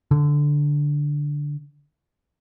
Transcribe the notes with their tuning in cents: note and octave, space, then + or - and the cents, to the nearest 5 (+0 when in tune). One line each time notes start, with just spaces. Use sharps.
D3 -5